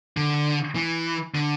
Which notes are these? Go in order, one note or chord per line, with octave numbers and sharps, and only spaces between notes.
D3
E3
D3